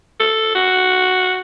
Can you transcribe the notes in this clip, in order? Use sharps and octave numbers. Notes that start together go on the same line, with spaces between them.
A4
F#4